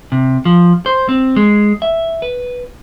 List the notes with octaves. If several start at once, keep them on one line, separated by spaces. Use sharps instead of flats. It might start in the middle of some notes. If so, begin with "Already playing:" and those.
C3
F3
C5
C4
G#3
E5
B4